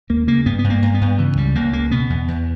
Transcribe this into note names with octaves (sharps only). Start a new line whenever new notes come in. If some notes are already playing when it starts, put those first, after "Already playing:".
D#2 A#3
C#3 A#3
G2 B3
B3
G2
A#3
G2
B3
G2
C#3 E3
C#2 G3
C#2 A#3
C#3 A#3
B2 B3
E2
E2